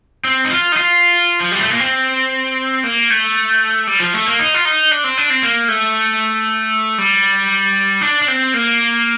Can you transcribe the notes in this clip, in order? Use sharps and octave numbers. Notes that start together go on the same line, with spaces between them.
C4
D#4
F4
D#4
F4
F3
G3
A3
A#3
C4
A#3
A3
G3
F3
A3
A#3
D#4
F4
D#4
D4
C4
D4
C4
A#3
A3
G3
D4
D4
C4
A#3